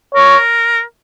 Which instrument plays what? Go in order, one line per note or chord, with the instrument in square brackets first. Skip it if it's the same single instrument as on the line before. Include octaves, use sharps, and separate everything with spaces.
[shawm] A#4 [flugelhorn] C#5